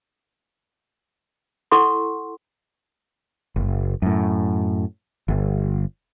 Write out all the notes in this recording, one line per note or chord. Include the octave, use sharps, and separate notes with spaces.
E4 A4 F#5 C6 C#6
F#1
F#2 A2
G1